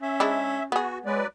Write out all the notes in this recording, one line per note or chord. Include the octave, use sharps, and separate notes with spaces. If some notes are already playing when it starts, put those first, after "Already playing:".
C#4 E5
G#3 D4 E4
B3 F#4 G#4
F#3 G#3 B4 D5